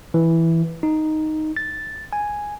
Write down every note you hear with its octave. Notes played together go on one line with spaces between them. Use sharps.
E3
D#4
A6
G#5